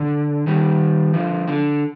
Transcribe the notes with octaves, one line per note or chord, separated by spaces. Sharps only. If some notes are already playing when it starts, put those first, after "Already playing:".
Already playing: D3
D#3 G3
D3 F3
D3